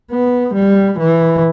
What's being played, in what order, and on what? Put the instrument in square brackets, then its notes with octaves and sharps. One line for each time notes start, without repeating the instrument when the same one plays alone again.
[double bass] B3
G3
E3